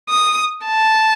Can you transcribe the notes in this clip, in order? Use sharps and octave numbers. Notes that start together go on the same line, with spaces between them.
D#6
A5